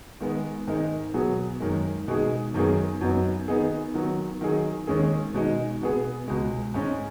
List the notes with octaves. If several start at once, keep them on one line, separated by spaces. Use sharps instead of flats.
D#3 G#3 B3
G#2 D#3 G#3 D#4
B2 F#3 B3 G#4
F#2 D#3 G#3
B2 G#3 D#4 G#4
F#2 D#3 B3 G#4
F#2 F#3 B3 D#4
D#3 B3 D#4 G#4
D#3 F#3 B3
D#3 F#3 D#4 G#4
D#2 D#3 G#3 C#4 G#4
B2 G#3 D#4
B2 B3 G#4
C#2 B2 G#3
G#2 G#3 C#4